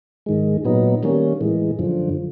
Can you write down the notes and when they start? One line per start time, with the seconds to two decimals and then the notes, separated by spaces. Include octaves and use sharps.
0.26 G#2 D#3 G#3
0.65 A#2 F#3 B3 D#4
1.03 D#3 G3 A#3 C#4
1.41 A2 E3 G#3
1.79 F#2 D3 F3